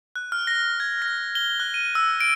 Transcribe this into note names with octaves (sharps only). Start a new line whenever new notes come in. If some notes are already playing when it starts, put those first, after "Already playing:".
F#6
F6
A#6
G#6
A#6
G7
F#6
D#7
E6
D7